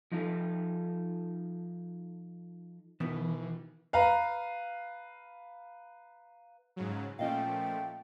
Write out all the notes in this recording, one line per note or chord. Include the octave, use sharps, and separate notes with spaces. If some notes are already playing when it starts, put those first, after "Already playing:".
F3 D#4 F4 A4
B2 D#3 E3 B3
B4 F5 A#5
G#2 C#3 F#3
A#2 F3 A3 C#4 D#5 F5 G5